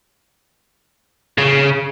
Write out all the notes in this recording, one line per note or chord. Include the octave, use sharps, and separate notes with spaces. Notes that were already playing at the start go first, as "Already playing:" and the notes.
C#3